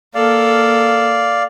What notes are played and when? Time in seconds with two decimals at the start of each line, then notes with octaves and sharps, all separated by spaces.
0.15 A#3 A4 D5 F5